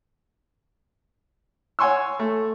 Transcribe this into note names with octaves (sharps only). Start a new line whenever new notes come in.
C#5 F#5 G#5 C6 C#6 E6
A3